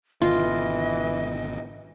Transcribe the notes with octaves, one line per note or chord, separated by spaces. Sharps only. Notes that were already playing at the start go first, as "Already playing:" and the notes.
G#1 B2 D3 E3 F4 D#5